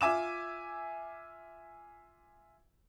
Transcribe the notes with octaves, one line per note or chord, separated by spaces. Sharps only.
F4 E5 G#5 D6 E7